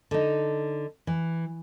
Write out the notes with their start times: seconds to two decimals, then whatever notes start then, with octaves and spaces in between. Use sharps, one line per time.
0.11 D3 D#4
1.07 E3